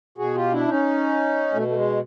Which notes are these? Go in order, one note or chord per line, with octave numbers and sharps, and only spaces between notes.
B2 F#4 G#4
F4 G4
D4 E4
C#4 D#4
B2 A3
A3
G#3